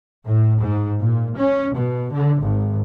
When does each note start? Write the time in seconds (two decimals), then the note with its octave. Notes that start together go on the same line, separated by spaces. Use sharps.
0.24 A2
0.59 G#2
0.99 A#2
1.37 C#4
1.73 B2
2.11 D3
2.41 G#1